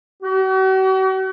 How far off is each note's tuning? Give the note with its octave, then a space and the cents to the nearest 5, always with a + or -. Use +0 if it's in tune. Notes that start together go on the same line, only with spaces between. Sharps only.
F#4 +45